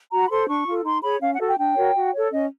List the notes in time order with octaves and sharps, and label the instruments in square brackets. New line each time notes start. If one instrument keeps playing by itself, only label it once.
[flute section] F#4 A#5
B5
A4 C5 C6
D4 C#6
F4 A4
D#4 C6
G#4 C#5 B5
C#4 F5
F#5
F#4 A4
G5
D4 G5
F#4 A#4 C#5
F#4
A4 C#5
C#4 D#5